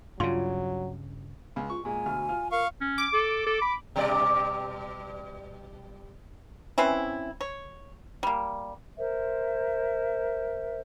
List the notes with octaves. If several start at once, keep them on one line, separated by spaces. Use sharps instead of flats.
G2 C#3 F#3 F4
C#2
F4 C#6
A#2 G#3 G#5
D2 B2 F6
F4 F6
A#4 F5 C#6
C#4
D6
A4
A4
B5
B2 G3 D5
E3 C4 C#4 E4
C#5
G3 A#3
A#4 C5 E5